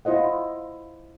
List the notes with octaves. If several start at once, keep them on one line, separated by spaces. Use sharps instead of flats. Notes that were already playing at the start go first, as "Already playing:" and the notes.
E4 F4 C5 D#5 F#5